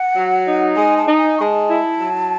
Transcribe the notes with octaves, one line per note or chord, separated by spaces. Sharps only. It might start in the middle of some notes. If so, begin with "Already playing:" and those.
Already playing: F#5
F#3
D#4
G#3 G#5
A5
D#4
G#5
G#3 A5 C#6
E4
F#3